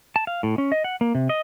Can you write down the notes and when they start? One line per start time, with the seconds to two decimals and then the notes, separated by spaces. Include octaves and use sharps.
0.16 A5
0.27 F5
0.43 A2
0.58 C#4
0.72 D#5
0.84 F#5
1.01 A#3
1.15 C3
1.29 D#5